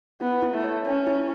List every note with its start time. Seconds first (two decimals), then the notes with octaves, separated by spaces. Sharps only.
0.21 B3 E4
0.42 E4
0.54 A3
0.64 C#5
0.85 C#4 C#5
1.07 E4